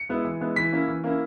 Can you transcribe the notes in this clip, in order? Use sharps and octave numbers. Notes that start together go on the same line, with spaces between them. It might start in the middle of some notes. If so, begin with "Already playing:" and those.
Already playing: C#7
G#3 B3 E4
E3
G#3 B3 E4
E3 B6
A#3 C#4 E4
E3
A#3 C#4 E4